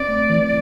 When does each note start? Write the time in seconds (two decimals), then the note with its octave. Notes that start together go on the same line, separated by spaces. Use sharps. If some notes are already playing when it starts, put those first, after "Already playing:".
Already playing: C4 D5
0.08 A3
0.30 E3